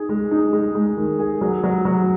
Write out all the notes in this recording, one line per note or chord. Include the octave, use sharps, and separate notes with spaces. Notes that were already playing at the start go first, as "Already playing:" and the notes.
Already playing: D#4 G#4
G#3
D#4
G#3
G#3
D#3
G#4
F#3
F#3
F#3